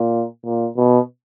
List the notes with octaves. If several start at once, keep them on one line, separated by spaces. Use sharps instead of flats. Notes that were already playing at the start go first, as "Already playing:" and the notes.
Already playing: A#2
A#2
B2